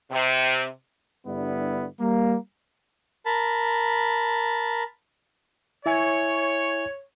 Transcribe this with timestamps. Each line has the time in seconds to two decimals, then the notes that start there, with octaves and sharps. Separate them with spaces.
0.10 C3
1.26 G2 D3 G3 B3 E4
2.00 G3 A#3
3.26 A#4 A5 B5
5.86 E4 C#5 E5 G#5